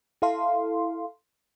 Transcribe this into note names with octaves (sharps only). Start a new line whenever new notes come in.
E4 A4 F5 C6